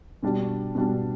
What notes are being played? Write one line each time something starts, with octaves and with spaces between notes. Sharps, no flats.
B2 G3 D4
B2 G3 D4